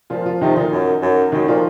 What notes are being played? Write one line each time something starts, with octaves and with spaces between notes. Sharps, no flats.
A#2 F3 F4
F3 F4
C3 D#3 D#4
A#2 D#3 D#4
F#2
F#2
F#2 D#3 D#4
A#2 F3 F4